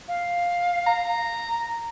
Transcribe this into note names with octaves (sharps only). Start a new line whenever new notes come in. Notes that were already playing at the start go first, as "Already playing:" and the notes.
F5
A#5